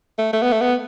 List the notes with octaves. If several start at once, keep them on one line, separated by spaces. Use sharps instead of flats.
A3
A3
B3
A3
B3